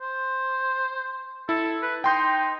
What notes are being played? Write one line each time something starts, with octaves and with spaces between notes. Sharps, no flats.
C5
E4 A4
B4
D#4 G5 C6 G6